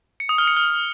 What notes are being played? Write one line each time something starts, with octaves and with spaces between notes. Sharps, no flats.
C#7
D#6
F6
C#7
F6